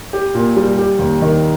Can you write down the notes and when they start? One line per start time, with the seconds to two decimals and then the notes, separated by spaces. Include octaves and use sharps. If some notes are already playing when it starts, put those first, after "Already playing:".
0.13 G4
0.35 A#2
0.57 G3
0.78 G4
0.99 D#2
1.22 D#3